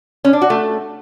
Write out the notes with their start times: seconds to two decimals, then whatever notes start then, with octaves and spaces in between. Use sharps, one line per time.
0.25 C#4
0.33 D4
0.42 F#4
0.50 A3